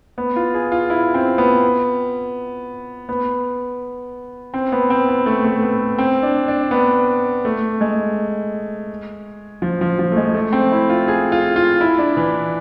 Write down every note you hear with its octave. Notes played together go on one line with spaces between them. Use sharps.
B3
F4
G#4
F4
E4
C4
B3
B3
C4
B3
C4
B3
A3
A3
B3
C4
D4
D4
B3
A3
G#3
F3
F3
F3
A3
G#3
A3
C4
E4
F4
G#4
F4
F4
E4
D4
E3